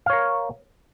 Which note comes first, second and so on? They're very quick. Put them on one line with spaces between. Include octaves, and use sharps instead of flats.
F5 C#5 A#4